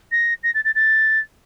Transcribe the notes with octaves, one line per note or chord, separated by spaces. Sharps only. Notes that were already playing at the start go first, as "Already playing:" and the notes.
A#6
A#6
A6
A6
A6